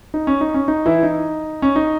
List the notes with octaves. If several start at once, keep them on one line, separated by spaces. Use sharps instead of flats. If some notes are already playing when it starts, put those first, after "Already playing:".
D#4
C#4
D#4
C#4
D#4
E3 E4
D#4
C#4
D#4